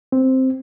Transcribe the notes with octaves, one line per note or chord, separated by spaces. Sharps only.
C4